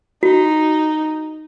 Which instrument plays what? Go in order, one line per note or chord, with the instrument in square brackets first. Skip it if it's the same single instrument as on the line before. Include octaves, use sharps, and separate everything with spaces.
[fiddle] D#4 [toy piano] F#4